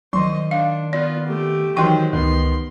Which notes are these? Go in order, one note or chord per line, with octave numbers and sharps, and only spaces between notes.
D#3 F#3 C5 D#5 C6
D4 F5
B3 F4 D5
A3 G4
D#3 E3 F#3 C5 G5 C6
C#2 D#3 B3 C6